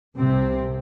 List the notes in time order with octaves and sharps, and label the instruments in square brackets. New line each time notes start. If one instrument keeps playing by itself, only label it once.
[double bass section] C2 C3 C4